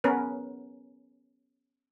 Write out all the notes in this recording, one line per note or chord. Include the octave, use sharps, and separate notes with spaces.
B3 C#4 A#4 B4